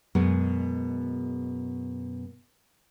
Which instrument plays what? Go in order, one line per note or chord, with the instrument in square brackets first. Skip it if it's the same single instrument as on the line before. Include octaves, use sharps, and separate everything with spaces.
[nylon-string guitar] F#2 B2 G#3 B3 G#4